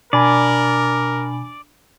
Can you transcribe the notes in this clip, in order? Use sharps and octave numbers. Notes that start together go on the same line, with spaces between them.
B2 D4 A#4 D5 G#5 B5